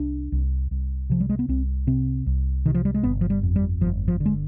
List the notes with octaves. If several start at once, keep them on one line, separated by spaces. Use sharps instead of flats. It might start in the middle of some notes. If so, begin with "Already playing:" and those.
Already playing: C2 D4
C2
C2
C3 F3
G3
G#3
B3
C2 C4
C3 C4
C2
C3 D#3
F3
G3
G#3
G1 B3
F3
G3
F2
G3
G1 F3
F3
D3
G#3